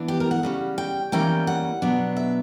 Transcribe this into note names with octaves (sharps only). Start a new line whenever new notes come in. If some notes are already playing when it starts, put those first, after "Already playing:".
Already playing: E3 B3 D4
G4
A#4
F#5
C#3 G3 C#4
G5
C#3 E3 G3 A#3 C#4 G5
F#5
B2 F#3 B3 D4
E5